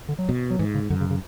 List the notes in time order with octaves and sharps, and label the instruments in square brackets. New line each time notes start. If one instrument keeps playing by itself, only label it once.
[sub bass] D3
F#3
[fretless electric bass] B2
[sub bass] F#3
[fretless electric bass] G#2 [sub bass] E3
[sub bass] C#3
[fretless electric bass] F#2 [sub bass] D3
[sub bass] C#3
C#3